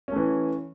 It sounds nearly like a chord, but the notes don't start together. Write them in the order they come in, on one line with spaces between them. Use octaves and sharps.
C#4 A3 E3